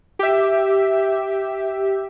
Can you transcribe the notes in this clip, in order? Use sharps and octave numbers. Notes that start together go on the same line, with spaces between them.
G4 E5